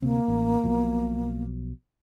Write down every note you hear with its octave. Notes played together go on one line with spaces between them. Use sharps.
D2 C3 A#3 C4
A1
B1 B2 F3